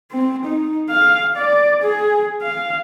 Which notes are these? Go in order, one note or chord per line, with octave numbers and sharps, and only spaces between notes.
C4
D#4
F5
D5
G#4
F5